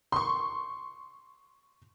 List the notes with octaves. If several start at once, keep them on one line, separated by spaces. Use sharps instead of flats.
C6 C#6